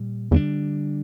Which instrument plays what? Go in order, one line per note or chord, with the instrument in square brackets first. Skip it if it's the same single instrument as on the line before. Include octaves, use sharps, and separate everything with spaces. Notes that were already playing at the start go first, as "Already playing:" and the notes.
Already playing: [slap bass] A#2 G3
[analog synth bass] E2 [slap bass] D3 G3 A#3 D4